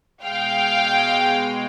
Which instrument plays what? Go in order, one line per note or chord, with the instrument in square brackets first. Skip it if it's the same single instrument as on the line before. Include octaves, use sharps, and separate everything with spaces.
[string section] B2 G#3 F5 G5